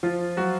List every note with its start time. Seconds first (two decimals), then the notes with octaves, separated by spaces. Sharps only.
0.03 F3 F4
0.37 F#3 F#4